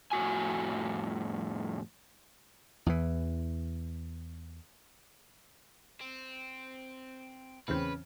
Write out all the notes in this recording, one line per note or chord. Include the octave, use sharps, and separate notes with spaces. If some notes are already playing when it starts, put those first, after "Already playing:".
F2 A2 F#4 G#5
E2 E3
C4
A1 E2 C#3 C4 B4